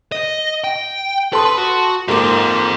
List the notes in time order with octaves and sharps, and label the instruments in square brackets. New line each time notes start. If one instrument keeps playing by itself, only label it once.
[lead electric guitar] D#5
G5
[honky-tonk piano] A4 C6 D#6 [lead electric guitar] B4
[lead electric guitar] F#4
[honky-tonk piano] G#2 A#3 D6 [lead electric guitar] F4 A4